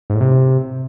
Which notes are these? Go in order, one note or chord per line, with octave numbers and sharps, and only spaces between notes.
G#2
A2
C3